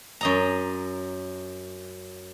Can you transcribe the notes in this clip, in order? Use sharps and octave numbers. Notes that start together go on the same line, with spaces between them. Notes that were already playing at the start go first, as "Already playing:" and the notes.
F#2 D#5 A#5